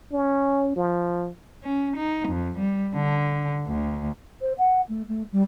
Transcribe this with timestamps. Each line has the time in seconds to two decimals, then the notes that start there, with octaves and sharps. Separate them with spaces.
0.12 C#4
0.76 F3
1.63 C#4
1.96 D#4
2.28 F2
2.58 G3
2.94 D3
3.67 D2
4.41 C5
4.58 F#5
4.89 A3
5.08 A3
5.32 G3